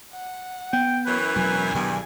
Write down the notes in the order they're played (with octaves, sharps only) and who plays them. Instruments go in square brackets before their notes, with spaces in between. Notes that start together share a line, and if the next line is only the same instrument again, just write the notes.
[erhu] F#5
[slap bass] B3 [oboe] G5
[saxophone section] F#2 E3 [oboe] B4
[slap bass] E1 F#3 [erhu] G#5
[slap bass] B1 D#3 [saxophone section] E2 G2